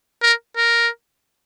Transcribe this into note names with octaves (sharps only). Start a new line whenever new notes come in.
A#4
A#4